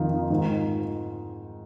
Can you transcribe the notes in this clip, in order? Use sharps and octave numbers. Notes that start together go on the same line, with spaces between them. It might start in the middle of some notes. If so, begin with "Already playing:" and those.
Already playing: F2 D#3 D#4 F4
D#4
G#2 D#3 D#4
F4